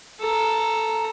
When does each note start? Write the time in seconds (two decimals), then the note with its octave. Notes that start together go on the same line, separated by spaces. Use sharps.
0.20 A4 A#5